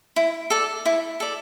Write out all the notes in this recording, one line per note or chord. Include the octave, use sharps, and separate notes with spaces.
E4
A4 D5
E4
A4 D5